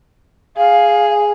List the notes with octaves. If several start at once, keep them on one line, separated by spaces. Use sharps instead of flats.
G#4 F5